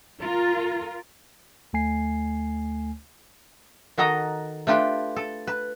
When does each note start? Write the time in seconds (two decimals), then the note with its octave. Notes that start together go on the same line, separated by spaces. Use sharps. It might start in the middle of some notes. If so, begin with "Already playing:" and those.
0.19 F4 A#4
1.73 D2 A3 G#5 C7
3.98 D#3 F#4 A4 D#5 A#5
4.67 A3 D4 F4 G4 B4
5.16 A4
5.47 B4